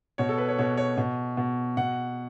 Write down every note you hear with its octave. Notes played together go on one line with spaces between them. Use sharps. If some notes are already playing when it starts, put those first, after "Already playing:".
B2 C#5
A4
B4
C#5
B2 C#5
C#5
B2
B2
B2 F#5